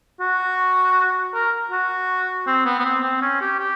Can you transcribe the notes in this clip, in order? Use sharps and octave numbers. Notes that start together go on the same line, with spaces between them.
F#4
A#4
F#4
C4
B3
B3
C4
C4
C#4
G4
G4